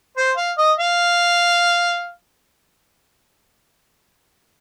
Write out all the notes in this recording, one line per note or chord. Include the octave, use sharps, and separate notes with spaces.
C5
F5
D#5
F5